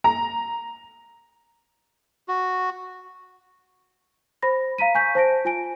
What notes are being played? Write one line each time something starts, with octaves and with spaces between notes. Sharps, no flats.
A#5
F#4
C5 B5 A#6
F5 A#5 B6 D#7
G#5 C#6 G6 B6
C5 A5 A#6 D7
F4 G#5 D7